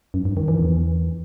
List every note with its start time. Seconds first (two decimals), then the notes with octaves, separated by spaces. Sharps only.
0.14 F#2
0.25 G2
0.37 D#3
0.48 E3
0.60 E2